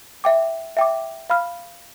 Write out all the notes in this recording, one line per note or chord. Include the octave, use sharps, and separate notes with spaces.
E5 G5 D6
E5 G5 D6
F5 B5 F6